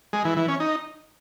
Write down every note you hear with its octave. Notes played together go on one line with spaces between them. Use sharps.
G#3
E3
E3
C#4
D#4